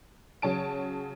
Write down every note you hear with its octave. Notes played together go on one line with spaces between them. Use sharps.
C#3 F#3 C#5 A5 D7